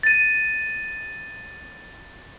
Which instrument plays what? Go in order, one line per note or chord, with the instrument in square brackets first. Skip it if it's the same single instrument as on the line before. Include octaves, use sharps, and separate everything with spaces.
[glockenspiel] A6 D#7